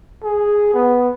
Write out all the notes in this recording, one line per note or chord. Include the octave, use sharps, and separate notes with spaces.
G#4
B3